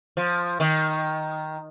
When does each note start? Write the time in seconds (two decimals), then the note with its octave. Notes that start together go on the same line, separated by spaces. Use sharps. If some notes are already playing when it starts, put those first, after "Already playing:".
0.17 F3
0.60 D#3